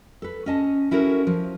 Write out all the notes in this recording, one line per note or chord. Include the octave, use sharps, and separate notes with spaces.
A4 B4
C#4 D#5 A5
C#4 E4 F#4 A4 A#4
F3